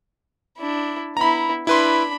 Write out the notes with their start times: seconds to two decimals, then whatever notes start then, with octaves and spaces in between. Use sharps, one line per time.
0.58 D4 E4
1.17 B3 E4 A#5 B5
1.67 D4 E4 B4 B5 C6